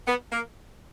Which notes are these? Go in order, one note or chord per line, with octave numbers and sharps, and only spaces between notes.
B3
A#3